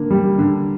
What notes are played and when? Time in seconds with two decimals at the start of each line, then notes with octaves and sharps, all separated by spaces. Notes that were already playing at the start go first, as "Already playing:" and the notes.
Already playing: D3 A#3
0.10 G3
0.38 D3